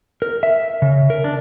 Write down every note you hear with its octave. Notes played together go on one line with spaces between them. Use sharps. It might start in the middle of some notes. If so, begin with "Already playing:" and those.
A#4
E5
C#3
A#4
D4